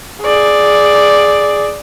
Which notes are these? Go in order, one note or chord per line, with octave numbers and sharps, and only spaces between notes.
G#4 D5